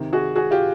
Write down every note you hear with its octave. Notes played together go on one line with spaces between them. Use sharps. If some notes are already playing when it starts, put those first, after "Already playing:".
Already playing: C3 D#3
F#4 G#4
F#4 G#4
F4 G4